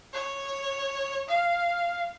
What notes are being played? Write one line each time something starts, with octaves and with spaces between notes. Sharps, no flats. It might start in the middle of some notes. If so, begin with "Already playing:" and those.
C#5
F5